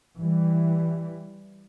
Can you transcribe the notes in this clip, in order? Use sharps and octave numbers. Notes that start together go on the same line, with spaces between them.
E3 G3